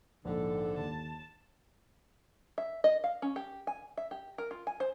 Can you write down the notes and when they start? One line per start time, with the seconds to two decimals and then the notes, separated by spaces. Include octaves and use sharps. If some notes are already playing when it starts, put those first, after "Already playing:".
0.25 A#1 G#2 D3 A4
0.77 D#2 A5
2.58 E5
2.84 D#5
3.04 F5
3.22 C#4
3.36 G4
3.67 G#5
3.97 E5
4.11 G4
4.38 A#4
4.51 F4
4.67 G#5
4.80 C5